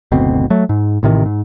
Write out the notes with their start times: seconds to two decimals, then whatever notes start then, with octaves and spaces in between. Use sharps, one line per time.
0.12 F#1 D2 B2 C4
0.50 F#3 A3
0.69 G#2
1.03 A1 A2 C3 D#3
1.25 G#2